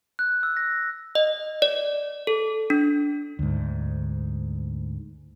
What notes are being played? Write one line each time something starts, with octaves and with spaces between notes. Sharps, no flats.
F#6
E6
A#6
D#5
D5
A4
D4
D2 G#2